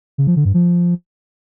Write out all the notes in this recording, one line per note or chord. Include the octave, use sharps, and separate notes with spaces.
C#3
F3
D3
G2
F3